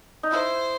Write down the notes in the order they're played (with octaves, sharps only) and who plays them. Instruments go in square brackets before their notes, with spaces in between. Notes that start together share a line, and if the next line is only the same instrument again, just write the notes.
[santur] D#4
[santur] E4 [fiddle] C5